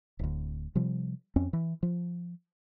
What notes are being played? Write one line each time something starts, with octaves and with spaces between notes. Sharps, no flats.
D1 D2
C3 F3 G3
F2 C4 C#4
E3
F3